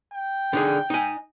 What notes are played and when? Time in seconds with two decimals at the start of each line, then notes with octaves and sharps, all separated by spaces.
0.14 G5
0.53 D3 D#4 G#4
0.90 D#4 G#5